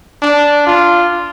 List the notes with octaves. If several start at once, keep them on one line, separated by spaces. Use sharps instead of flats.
D4
F4